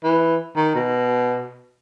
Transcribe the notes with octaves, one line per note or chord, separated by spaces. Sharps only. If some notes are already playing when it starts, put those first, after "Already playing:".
E3
D#3
B2